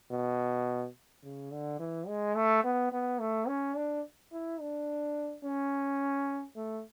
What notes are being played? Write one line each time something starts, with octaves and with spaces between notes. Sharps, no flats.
B2
C#3
D3
E3
G#3
A3
B3
B3
A3
C#4
D4
E4
D4
C#4
A3